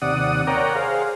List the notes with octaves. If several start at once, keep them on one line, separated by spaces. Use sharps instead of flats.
D#2 C3 D5 F#5 D#6
A#4 C#5 D5 F#5 G5 A#5
G#4 C5 F5